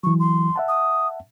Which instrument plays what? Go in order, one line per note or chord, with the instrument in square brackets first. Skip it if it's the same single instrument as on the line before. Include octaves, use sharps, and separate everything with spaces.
[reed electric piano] E3 F#3 [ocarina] C#6
[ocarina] C6
[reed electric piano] E5 F#5 A5
[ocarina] D#6